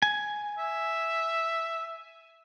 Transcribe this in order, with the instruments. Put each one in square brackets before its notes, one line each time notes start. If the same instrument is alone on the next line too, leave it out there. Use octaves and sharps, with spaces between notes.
[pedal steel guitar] G#5
[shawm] E5